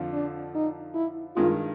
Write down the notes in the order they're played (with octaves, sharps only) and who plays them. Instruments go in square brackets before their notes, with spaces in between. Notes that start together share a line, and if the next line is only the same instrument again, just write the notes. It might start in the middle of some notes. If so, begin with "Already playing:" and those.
Already playing: [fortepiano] F2 D3 F3
[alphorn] D4
D#4
E4
[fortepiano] G2 D#3 G#3 [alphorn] F4